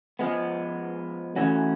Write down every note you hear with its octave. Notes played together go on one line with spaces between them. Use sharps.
F3 G#3 B3
E3 A3 C#4 F#4